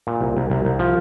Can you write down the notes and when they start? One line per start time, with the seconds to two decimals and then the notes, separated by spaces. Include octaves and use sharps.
0.07 A#2
0.21 C2
0.37 C2
0.50 C2
0.65 C2
0.79 F3